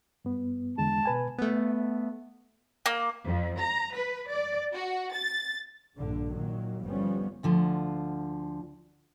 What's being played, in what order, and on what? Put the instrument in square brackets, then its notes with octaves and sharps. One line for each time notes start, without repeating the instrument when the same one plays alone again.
[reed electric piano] G2 B3
[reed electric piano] E2 D3 G#3 [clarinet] A5
[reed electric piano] B2 B4 G#5
[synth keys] A3 B3
[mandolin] A#3
[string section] F2
A#5
B4
D5
F#4
A6
[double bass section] A#1 G2 D3
A#2 D#3 F#3
G1 F3 G3 B3 C#4
[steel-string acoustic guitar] D2 D3 F3